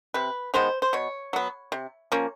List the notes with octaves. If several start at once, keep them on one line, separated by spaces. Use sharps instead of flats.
C3 B4
D#3 G#3 B3 C5
C5
B2 C#5
F#3 B3
C3
F3 A#3 C#4